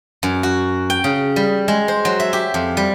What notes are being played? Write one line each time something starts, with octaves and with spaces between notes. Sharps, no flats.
F#2
F#4
G5
C#3
G3
G#3
C5
F#3
E5
G4
F2
G3